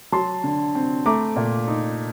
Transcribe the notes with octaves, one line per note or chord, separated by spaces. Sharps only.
F#3 A5 C6
D3
C4
A3 A#5 D6
A#2
D#4